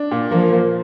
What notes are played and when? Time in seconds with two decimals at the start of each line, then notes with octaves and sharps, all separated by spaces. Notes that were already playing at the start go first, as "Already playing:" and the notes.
Already playing: D4
0.11 A#2
0.32 F3 A#3
0.53 A#3